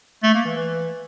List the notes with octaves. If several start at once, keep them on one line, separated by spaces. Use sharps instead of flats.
A3
A#3
E3
E3